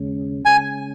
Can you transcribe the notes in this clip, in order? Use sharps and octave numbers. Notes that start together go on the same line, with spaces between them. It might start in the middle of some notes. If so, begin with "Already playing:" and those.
Already playing: D#2 C#3 G#3 C#4
C#3 G#3 C#4 G#5